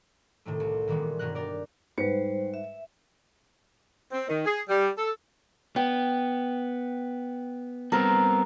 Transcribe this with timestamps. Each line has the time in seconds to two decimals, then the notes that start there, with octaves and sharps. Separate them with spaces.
0.45 A2 C3 D#3 A3
0.60 C2
0.88 A#2 D#3 E3 G3 G#3 B3
1.19 D#1 G2 B2 D#3 A#4 F#6
1.35 G4 A#4 D5
1.98 G#2 G3 B4 C5 C#7
2.54 E5
4.12 C4
4.29 D#3
4.46 G#4
4.69 G3
4.98 A4
5.76 B3 G5
7.92 G3 B3 C4 A#4